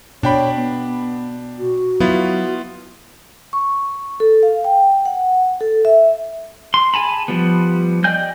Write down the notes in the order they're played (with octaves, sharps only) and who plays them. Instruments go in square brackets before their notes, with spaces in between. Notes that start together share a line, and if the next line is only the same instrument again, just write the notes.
[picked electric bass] B2 [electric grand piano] D4 G5 B5 [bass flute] C#5
[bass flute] B3
F#4
[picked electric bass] F#3 [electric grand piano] B3 E4 F4
[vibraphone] C#6
A4
F5
G5
F#5
A4
E5
[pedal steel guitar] C6
G#4 G#5 A5 B5
F3 G3 B3
D5 D#5 G5 G#5 G6